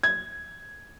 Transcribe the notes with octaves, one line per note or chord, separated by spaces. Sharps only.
G#6